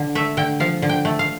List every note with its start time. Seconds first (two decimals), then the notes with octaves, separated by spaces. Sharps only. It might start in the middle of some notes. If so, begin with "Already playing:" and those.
Already playing: D3
0.15 A3 E5
0.37 D3 G5
0.60 F3 F5
0.82 D3
0.89 G5
1.05 A3
1.19 F5